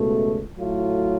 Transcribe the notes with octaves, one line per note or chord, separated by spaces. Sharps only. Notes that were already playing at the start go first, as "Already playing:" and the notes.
Already playing: C#2 B2 A3
A2 F#3 A3 F4